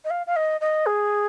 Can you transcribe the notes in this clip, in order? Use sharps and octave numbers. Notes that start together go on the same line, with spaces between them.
D#5
F5
F5
D#5
D#5
G#4